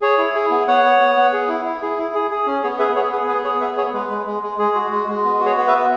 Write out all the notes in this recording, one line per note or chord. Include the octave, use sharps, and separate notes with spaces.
G#4 C#5
E4
G#4
B3
B3 C#5 F#5
B3
B3
B3
G#4
E4
E4
G#4
E4
G#4
G#4
C#4
B3 G#4 C#5
G#4 B4 E5
B3 G#4 C#5
G#4 B4
B3 B4
G#4 C#5
B3 B4 E5
G#4 C#5
G#3 B4
G#3
G#3
G#3
G#3 G#4
F#4
G#3
G#3
B3
F#4
G#4 C#5
B3
B4 E5
B3